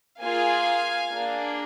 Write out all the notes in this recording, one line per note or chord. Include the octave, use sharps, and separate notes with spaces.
A#3 F4 G#4 F5 G#5
A#3 D4 G#4